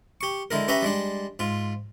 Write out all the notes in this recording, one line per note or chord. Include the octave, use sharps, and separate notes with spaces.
G4 C#6
D3 G#3 E4 A#4
C#4 G4 B4 E5 A#5 B5
G3 G#3 D4
G#2 F4